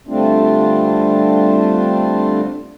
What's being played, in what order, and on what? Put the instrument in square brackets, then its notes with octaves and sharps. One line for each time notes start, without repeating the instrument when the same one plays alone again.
[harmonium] D3 G3 A3 C4 D4 F4